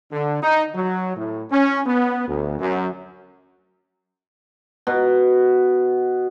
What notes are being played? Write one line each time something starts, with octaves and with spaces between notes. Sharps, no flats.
D3
D#4
F#3
A2
C#4
B3
D2
F#2
B2